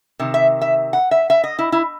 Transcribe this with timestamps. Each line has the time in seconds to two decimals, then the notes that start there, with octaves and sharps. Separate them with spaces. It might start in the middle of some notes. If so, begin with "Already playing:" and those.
0.19 C3 D#3
0.34 E5
0.62 E5
0.93 F#5
1.11 E5
1.30 E5
1.44 D#5
1.59 E4
1.72 E4